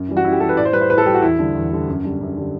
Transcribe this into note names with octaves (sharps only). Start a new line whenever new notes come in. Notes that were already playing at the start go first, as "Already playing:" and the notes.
Already playing: F#2
E3 G3
F#4
F#2 E4
G4
E3 G3 A4
B4
A2 D5
C5
G3 B4
C5
A2 B4
A4
G3 G4
F#4
E2 E4
D3 G3
E2
D3 G3
F#2
D3 G3
F#2
D3 G3